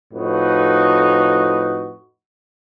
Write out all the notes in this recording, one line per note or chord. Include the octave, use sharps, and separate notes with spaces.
F2 A2 D#4 F#4 B4